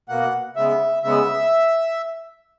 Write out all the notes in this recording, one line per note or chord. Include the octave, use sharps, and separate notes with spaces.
B2 A#3 F#5
C#3 G#3 B3 E5
C#3 G#3 B3 E5